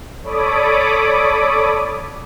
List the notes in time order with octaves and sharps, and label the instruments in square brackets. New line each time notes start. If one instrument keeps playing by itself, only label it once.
[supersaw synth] A4 C#5 D5 B5 D6 D#6